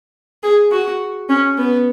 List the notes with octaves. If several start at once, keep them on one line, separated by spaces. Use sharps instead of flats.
G#4
F#4
C#4
B3